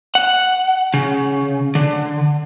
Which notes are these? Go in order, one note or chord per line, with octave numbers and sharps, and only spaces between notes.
F#5
C#3
D3